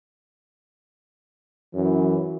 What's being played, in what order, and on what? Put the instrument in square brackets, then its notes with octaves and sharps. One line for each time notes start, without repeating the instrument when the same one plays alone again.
[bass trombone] F#2 [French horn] E3